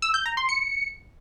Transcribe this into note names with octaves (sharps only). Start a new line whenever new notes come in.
E6
G6
A#5
C6
C#7